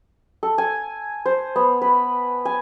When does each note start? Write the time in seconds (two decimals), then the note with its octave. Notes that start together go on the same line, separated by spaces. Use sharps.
0.43 A4
0.58 G#5
1.26 C5
1.56 B3
1.81 B4
2.45 G#5